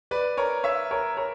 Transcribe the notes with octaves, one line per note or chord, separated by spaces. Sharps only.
B4 D5
A#4 C#5
C#5 E5
A#4 C#5
A#4 C#5